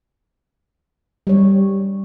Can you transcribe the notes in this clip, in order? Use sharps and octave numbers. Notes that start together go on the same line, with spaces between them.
G3 C#5